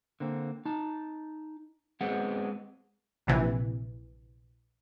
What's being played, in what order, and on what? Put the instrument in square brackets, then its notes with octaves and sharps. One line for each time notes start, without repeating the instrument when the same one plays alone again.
[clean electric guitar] D3 A#3 C4
D#4 A5
[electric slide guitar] G#3 B3 C4 [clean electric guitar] F#5
[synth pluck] A#1 C3 E3